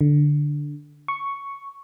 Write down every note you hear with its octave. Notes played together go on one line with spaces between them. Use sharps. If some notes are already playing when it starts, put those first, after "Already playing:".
D3
C#6